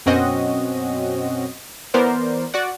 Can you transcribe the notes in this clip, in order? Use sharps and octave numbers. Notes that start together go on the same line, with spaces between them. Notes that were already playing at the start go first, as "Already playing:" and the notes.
F#2 B2 C4 C#4 F#4 D#5
E3 B3 A#4 C5 D5
F#4 D5 F#5